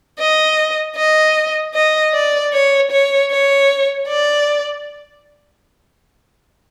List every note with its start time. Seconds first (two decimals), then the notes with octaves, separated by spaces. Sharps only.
0.19 D#5
0.96 D#5
1.74 D#5
2.13 D5
2.53 C#5
2.91 C#5
3.30 C#5
4.07 D5